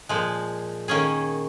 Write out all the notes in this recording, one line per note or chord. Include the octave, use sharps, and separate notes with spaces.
A#2 F3 G#3
D#3 A#3 C#4 G#4